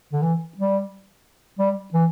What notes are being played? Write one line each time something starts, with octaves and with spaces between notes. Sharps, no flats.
D3
E3
G3
G3
E3